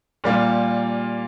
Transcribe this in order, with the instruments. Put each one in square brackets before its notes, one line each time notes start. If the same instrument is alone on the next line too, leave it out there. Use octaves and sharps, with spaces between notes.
[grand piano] A#2 G3 A#3 F4